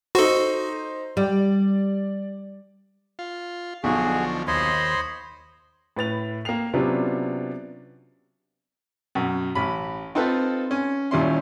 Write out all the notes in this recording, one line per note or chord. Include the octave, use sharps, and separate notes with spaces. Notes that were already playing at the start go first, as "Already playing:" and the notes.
D#4 F#4 A4 C5
G3 D5
F4
B1 B2 D3 F3 D#4 F#4 G#4
D#2 C5 C#5 D#5 B5 C6
A2 B4 A6 F7
A#3 F5 G5 C7 F7
C3 F#3 B3 C#4 D4 F4
F#2 B2
A1 B5
C4 D#4 F4 A4 B4 C5
C#4
D#2 A#2 G3 C#4 E4 C6